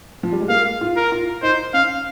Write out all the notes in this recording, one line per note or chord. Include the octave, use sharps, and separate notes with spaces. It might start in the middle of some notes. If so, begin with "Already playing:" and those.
F3
G3
G#3
A#3 F5
F4
A#4
F4
D#4 C5
C#4 F5